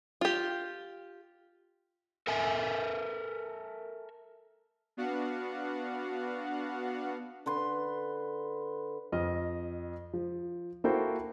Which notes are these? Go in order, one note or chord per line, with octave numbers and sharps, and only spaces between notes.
F4 G4
A4 A#4 E5 G#5
B3 D4 F#4 F5 F#5
D3 B4 C6
F2 D#5 F6
F3
A#3 E4 F#4 A4 C5 G5